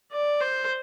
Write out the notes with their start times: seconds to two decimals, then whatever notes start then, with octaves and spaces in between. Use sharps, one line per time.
0.12 D5
0.41 C5